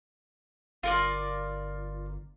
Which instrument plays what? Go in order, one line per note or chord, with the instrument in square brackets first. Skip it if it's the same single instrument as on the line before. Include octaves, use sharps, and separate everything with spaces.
[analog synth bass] G1 [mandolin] F4 A#4 D5